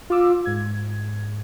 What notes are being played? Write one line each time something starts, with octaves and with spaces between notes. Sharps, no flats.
F4 F5 D6 E6
G#2 G#6